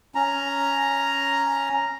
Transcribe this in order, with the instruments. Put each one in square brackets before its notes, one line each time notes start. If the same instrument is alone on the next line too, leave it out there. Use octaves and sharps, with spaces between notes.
[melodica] C#4 A#5